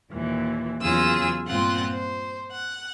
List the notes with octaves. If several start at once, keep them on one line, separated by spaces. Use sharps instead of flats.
D#2 A#2 E3
E2 C#3 F#3 F4 G#4 E6
G2 A#2 C4 F4 F#5
C5
F#5